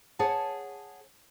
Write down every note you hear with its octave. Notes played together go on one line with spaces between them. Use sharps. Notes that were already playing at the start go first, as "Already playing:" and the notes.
G#4 C#5 F#5 A5